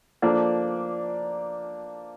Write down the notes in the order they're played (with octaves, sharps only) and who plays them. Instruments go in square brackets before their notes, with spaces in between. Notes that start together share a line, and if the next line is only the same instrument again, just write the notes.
[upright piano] F3 A#3 D4 A4 D5